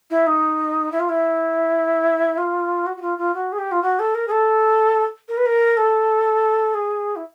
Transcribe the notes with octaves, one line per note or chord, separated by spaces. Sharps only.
E4
D#4
E4
F4
E4
F4
F#4
F#4
F4
F4
F#4
G#4
G4
F4
F#4
A4
A#4
G#4
A4
A#4
B4
A#4
A4
G#4
E4